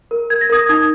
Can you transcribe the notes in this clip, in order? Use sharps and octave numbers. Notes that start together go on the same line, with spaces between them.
A#4
A#4 G#6
A#6
A#4 D#6 G#6
D#4 D#6 G#6